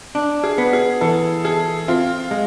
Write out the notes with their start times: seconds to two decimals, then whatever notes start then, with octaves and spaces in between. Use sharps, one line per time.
0.15 D4
0.44 G#4
0.58 B3
0.73 G#4
1.01 E3 A4
1.45 G#4 A4
1.88 C4 F4
2.31 G#3